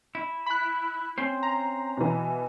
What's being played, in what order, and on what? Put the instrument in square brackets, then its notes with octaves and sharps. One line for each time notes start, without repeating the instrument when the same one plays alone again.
[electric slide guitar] E4
[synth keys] B5 F#6
[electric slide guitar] C4 C#4 C5
[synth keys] A#5
[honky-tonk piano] B2 E3